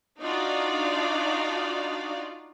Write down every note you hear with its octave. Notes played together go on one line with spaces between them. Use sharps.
D4 D#4 F4 F#4 D5 F5